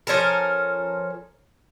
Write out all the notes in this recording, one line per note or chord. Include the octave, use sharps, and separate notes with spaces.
F3 C#4 A4 A#4